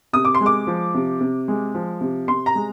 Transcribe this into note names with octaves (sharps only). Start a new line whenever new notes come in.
C3 D#6
D6
C6
G#3
D6
F3
C3
C3
G#3
F3
C3
C3 C6
A#5
G#3